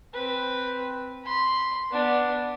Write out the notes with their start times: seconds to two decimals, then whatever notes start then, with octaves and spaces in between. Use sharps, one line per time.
0.14 C4 B4
1.24 B5 C6
1.91 B3 D4